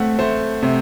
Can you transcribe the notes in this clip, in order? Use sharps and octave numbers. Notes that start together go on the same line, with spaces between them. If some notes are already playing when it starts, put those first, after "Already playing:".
Already playing: A3 C4 E5 F#5
A3 C5
C3